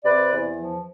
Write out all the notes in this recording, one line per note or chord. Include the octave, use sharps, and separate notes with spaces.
C3 B4 D5
E2
F3